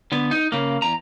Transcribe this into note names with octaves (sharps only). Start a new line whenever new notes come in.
D3 B3
D#4
C#3 A#3
E2 A#5